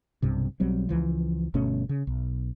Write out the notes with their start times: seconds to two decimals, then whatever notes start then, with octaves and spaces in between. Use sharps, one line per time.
0.22 B1 G2 C3
0.60 B1 F#3 G3 C4
0.89 C#2 E3 F3
1.54 G1 B2 A3 C#4
1.89 C#3
2.07 B1